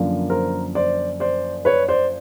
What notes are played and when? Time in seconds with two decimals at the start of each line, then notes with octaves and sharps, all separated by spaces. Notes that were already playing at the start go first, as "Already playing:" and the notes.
Already playing: F#2 D3 F3 A#3
0.30 A#4 C5
0.75 C5 D5
1.20 C5 D5
1.65 B4 C#5
1.88 C5 D5